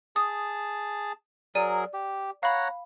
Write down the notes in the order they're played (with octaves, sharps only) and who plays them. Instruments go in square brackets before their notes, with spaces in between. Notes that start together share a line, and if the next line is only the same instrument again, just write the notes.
[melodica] G#4 A5 [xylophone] D#6
[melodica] F#3 G#4 A#4 [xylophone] D5 D#7
[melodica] G4
[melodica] C#5 F#5 A#5 [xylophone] F5 B5